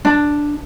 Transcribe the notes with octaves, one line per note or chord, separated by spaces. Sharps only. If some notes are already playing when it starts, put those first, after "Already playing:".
D4